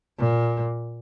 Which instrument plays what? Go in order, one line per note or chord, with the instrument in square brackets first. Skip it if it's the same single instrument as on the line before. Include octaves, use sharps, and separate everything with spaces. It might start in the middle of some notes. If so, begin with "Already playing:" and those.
[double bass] A#2